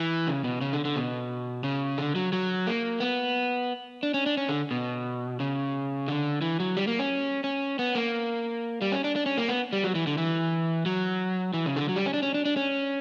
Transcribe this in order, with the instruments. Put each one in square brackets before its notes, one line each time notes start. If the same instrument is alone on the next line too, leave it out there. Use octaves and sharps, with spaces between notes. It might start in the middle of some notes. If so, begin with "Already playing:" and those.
Already playing: [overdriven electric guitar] E3
C#3
B2
C#3
D3
D3
B2
C#3
D3
F#3
F#3
A#3
B3
D4
C#4
D4
C#4
D3
B2
C#3
D3
E3
F#3
G3
A#3
C#4
C#4
B3
A#3
G3
C#4
D4
D4
C#4
A#3
B3
G3
F#3
E3
D3
E3
F#3
E3
C#3
D3
F#3
G3
C#4
D4
C#4
D4
D4
C#4